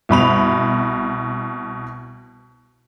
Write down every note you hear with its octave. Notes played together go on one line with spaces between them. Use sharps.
C2 B2 B5 F7